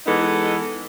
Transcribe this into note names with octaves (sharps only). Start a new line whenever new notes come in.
E3 G#3 B3 D#4 A4